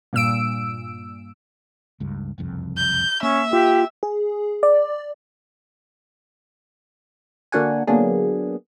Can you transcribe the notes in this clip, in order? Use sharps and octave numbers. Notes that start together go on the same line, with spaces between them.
G2 A#2 E6 D7
C#2 G2
F#1 C2 F2
G6
A#3 C#4 E5
F4 G4
G#4
D5
D3 A#3 D4 F#4 F#5 G#5
D3 F#3 A#3 B3 D4 G#4